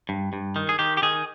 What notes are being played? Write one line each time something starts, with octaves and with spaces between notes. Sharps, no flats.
G2
G2
D#3
G#4
D#3 G4
G4
D#3 G#4